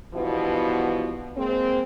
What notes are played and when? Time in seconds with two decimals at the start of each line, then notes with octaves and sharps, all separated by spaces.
0.14 G2 B2 E3 F3 B3
1.37 G#3 A#3 C4